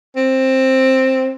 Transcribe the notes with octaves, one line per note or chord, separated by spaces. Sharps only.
C4